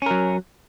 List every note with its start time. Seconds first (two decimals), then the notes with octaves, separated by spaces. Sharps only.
0.02 C#4
0.06 A#4
0.11 F#3